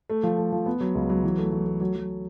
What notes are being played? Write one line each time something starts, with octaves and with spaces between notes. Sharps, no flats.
A3
F3
A3
F3
B3
F#3
C#2
F#3
E3
A3
E3
A3
F#3
F#3